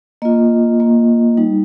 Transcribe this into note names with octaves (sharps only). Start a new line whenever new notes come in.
A#3 F4 D#5
A#3 F4
G3 D#4